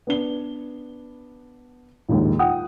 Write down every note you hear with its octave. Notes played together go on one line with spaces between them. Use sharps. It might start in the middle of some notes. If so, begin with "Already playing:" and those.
B3 D4 G7
A#1 D#2 G#2
F4 F#5 G5 D#6